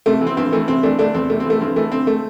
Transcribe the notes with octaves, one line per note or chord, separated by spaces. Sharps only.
C3 A3
E3
C4
G2 C4
E3 A3
C3 C4
E3 A3 D4
D3 A3 D4
E2 C4
C3 A3
C4
E3 A3
G2 C4
E3 A3
D3 C4
A3